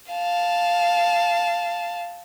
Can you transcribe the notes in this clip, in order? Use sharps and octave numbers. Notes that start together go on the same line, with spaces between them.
F5 A5